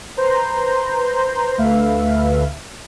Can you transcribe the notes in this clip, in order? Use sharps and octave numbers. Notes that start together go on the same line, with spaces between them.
B4 C5 A#5 C6 G6
D2 A3 B4 E5 F5